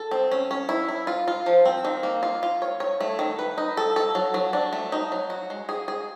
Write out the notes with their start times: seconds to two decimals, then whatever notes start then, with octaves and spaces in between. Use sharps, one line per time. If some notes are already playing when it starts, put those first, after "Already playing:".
Already playing: A4
0.11 C4
0.32 C#4
0.51 C#4
0.69 E4
0.89 E4
1.07 F4
1.28 F4
1.46 F3
1.65 C4
1.85 D#3
2.03 A#3
2.23 F4
2.43 F4
2.62 C#5
2.80 C#5
3.01 A3
3.19 D#3
3.39 B4
3.58 D#4
3.77 A4
3.96 A4
4.15 F#3
4.34 F#3
4.53 D4
4.73 A3
4.92 D#4
5.12 F#3
5.30 F#4
5.50 G#3
5.69 G#4
5.88 G#4